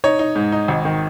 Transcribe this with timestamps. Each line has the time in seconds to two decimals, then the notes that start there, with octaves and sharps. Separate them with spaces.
0.04 D#4 C#5
0.19 D#4
0.35 G#2
0.52 D#4
0.68 G#1
0.85 D#3